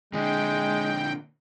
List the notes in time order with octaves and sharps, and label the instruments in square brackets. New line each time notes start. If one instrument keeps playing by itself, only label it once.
[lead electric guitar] A#2 D3 [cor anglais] G#3 [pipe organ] G5